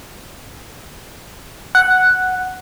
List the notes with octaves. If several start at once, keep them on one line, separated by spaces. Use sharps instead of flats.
F#5